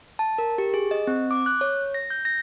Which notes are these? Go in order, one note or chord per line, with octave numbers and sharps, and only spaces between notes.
A5
A#4
G4
G#4
D#5
C4
D6
F#6
C#5
A#6
G6
A#6